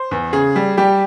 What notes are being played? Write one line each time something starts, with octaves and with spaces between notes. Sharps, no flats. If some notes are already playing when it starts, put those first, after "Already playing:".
Already playing: C5
E2
C#3 G#4
G3
G3 G4